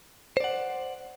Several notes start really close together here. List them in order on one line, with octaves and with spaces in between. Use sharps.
C5 D5 F#5